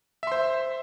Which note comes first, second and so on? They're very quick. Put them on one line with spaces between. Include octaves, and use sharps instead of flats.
E5 C6 C5